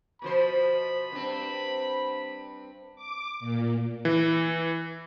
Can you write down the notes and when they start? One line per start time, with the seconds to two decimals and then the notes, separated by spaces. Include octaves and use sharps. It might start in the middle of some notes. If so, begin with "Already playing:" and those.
0.22 B2 F3 C5 B5
1.12 G2 C4
2.96 D6
3.40 A#2
4.05 E3